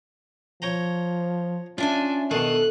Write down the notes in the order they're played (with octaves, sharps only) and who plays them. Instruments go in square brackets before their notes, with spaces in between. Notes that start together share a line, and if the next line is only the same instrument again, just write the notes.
[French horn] F3 [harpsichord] C#5 G5 A#5
[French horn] C#4 [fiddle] D4 [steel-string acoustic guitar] F4 E5 G#5
[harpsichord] B2 D#3 [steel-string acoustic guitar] A4 [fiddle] F#6